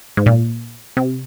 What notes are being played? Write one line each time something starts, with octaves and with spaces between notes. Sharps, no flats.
G#2
A#2
C3